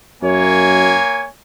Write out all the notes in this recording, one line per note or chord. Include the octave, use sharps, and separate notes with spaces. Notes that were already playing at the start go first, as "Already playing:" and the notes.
F#2 A#3 C#5 G#5